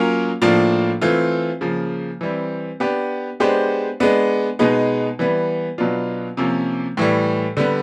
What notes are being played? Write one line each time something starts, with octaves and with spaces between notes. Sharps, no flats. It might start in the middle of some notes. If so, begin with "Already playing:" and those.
Already playing: F#3 A#3 C#4 F4 A#4
A2 F3 A#3 D4 F4
E3 A3 C4 F4
C#3 F3 A#3
E3 G3 C4
B3 D4 G4
G#3 B3 D4 G4 C5
G#3 B3 D4
B2 G#3 B3 D#4
E3 G3 B3
B2 F#3 B3 D4 F4
C3 F3 A#3 C#4
A2 E3 G3
D3 G3 B3